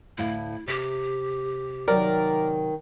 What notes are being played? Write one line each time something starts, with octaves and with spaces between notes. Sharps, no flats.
D2 A2 E4 F5
C3 G4
C3 D#3 F#3 A#4 D5 G5